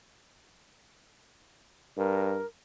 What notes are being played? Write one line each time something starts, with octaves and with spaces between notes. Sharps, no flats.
G2 A#4